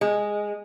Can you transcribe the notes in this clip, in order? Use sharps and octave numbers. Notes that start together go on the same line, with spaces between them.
G#3